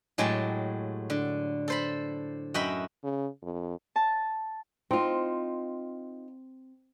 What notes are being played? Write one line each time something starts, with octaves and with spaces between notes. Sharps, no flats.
A2 F#3 G#3 G4 G#5 A5
D3
A4 C5 B5
F#2 F#4 D#5 E5 G5 B5
C#3
F2
A5
C4 D#4 F4